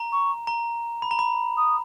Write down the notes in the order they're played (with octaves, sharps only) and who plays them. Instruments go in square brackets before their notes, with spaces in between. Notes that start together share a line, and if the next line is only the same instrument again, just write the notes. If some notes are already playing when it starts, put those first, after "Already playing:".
Already playing: [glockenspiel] A#5
[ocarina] C#6
[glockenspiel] A#5
B5
A#5
B5
[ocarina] D#6